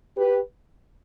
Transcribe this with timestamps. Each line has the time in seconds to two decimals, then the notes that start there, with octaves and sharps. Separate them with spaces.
0.17 G4 B4